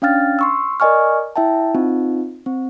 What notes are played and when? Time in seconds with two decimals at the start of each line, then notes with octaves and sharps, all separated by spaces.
0.02 C#4 D4 F5 G5 F6 A6
0.39 C6 C#6 E6
0.80 A#4 D5 D#5 G#5 C#6 F6
1.36 E4 E5 G5 A5
1.75 C4 D#4 F4
2.46 C4